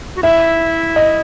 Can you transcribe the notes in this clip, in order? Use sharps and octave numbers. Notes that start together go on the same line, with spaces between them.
F#4
E4 E5
D#5